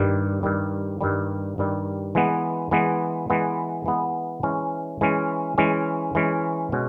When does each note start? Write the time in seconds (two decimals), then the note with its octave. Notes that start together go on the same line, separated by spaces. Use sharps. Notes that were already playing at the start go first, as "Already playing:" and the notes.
Already playing: G2 D#3 G3
0.43 G2 D#3 G3
1.01 G2 D#3 G3
1.58 G2 D#3 G3
2.15 E3 G#3 B3
2.71 E3 G#3 B3
3.30 E3 G#3 B3
3.86 E3 G#3 B3
4.43 E3 G#3 C#4
5.01 E3 G#3 C#4
5.58 E3 G#3 C#4
6.15 E3 G#3 C#4
6.72 B2 G#3 C#4